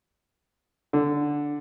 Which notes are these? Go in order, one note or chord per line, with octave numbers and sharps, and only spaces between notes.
D3